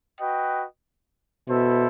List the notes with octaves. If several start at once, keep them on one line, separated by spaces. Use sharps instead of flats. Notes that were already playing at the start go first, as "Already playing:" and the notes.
F#4 B4 D#5 G5
B2 E4 A4 C5 E5